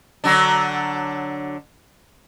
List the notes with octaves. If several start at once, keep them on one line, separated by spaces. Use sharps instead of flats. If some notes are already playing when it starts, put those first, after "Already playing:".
D3 F#3 D4